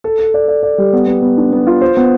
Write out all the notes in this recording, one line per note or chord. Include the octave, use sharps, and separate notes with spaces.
A4
A4
D5
D5
D5
G3
B3
B3
B3
D4
B3
F4
C5
B3